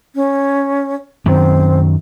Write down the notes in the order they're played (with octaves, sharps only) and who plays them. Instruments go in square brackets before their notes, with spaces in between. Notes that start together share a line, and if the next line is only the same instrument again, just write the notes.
[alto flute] C#4
[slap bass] F#2 D#3 F#3 [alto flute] C4